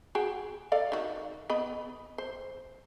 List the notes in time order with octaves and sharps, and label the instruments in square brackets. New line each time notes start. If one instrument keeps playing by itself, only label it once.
[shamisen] F#4 G#4 G5
A4 D5 F5
D#3 F#4
B3 D#5 B5
C5